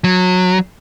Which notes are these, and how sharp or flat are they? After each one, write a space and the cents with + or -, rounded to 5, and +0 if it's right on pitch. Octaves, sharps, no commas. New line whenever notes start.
F#3 -20